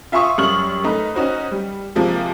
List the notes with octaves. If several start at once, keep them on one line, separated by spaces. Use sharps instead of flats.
F4 E5 G#5 C6 C#6 D#6
F#2 G3 C#6 F6 F#7
A3 D#4 B4
C#4 D#4 F#4 C5
G3
C3 F3 G#3 A#3